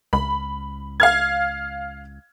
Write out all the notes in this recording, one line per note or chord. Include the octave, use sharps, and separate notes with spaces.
C#2 B5
F5 F6 G#6